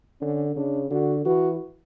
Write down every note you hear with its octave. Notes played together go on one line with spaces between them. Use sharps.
D3 C#4
C#3 D4
D3 F#4
E3 F#4